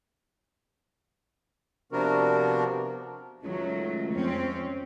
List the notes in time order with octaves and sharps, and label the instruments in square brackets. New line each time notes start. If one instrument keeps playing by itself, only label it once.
[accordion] C3 F3 B3 D4 F#4 A#4
[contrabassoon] C#2 [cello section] D#3 F#3 A3
[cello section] F2 C4 C#4